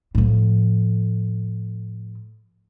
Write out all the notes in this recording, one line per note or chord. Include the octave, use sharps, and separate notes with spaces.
A2 F3